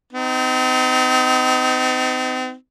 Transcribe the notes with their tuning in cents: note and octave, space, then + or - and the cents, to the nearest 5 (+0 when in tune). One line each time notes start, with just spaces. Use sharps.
C4 -40 D#4 +0